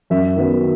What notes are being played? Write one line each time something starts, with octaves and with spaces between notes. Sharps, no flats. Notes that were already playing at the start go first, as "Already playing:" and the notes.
F#2 E5
D#3 F#3 B3